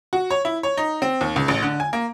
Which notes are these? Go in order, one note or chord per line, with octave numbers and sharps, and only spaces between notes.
F#4
C#5
E4
C#5
D#4
C4
D#2
C#2
A1
D3
G#5
A#3